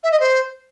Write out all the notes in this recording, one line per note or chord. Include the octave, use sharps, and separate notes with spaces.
E5
D#5
C5